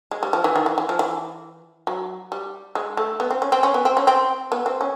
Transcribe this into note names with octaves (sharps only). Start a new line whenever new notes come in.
G#3
G3
F3
E3
D#3
E3
E3
F3
E3
F#3
G3
G#3
A3
B3
C4
C#4
C4
C#4
B3
C4
C#4
C4
B3
C4
C#4